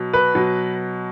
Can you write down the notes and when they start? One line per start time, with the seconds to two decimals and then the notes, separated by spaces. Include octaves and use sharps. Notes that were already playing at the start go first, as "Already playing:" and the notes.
Already playing: B2 F#3
0.13 B4
0.35 B2 F#3